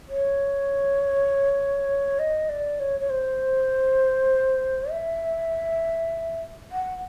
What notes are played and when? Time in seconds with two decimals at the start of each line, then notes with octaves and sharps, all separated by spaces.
0.08 C#5
2.19 D#5
2.49 D5
2.80 C#5
3.00 C#5
3.10 C5
4.91 E5
6.72 F#5